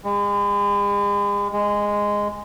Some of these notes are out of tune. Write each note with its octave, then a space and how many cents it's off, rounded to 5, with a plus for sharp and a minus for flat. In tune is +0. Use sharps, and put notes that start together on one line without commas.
G#3 -40
G#3 -10